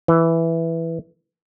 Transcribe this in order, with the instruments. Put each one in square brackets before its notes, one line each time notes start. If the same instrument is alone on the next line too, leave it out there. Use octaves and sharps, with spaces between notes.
[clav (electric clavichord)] E3